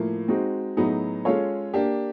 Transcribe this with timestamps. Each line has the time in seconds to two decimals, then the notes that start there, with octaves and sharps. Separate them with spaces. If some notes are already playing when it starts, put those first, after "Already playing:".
Already playing: A2 F3 A#3
0.28 G#3 C4 D#4 F#4
0.77 A2 F#3 B3 D#4 G#4
1.25 G#3 C#4 F4 A4 C#5
1.74 A#3 D4 G4